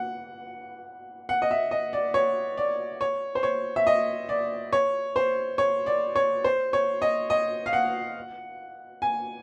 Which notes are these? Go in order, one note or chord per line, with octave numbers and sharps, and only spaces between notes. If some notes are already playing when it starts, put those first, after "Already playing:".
Already playing: F#5
F#5
D#5
E5
D#5
D5
C#5
D5
C#5
C5
C#5
E5
D#5
D5
C#5
C5
C#5
D5
C#5
C5
C#5
D#5
D#5
F5
F#5
G#5